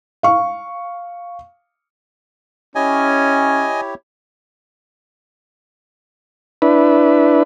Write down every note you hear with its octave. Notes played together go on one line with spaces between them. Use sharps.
F5 C#6
C#4 E4 G4 C#5 D#5 G#5
D4 E4 B4